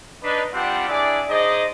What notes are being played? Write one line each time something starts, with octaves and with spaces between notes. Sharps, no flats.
D4 D#4 B4
G3 C4 D4 F4 G4 F#5
D4 E4 G#4 D5
D#4 G#4 C5 D5 D#5